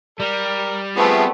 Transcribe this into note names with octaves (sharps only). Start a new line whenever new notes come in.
G3 A#4
F3 A3 B3 C4 G#4